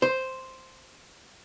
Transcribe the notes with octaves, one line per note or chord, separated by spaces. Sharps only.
C5